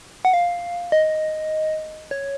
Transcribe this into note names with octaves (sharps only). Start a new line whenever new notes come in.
F#5
F5
D#5
C#5